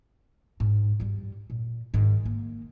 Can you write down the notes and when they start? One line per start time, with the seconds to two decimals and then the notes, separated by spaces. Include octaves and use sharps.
0.60 G#2
1.00 G2 G3
1.50 A#2
1.94 G#2 D#3
2.26 A#3